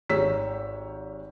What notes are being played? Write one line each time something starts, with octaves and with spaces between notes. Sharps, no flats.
G#1 G4 C#5 A#5 E6 B6